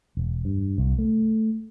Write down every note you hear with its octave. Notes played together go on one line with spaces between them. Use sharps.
E1
G2
C2
A3